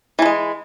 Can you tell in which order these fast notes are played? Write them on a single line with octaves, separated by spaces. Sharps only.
E3 A3 G#3